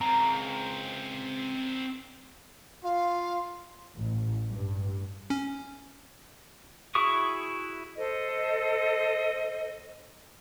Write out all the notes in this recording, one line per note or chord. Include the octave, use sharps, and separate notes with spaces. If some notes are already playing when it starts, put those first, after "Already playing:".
C#2 C4 A#4 A#5
F4 F5
A1
G2
C#4
E4 F#4 G#4 C#6 D#6
A4 C5 D#5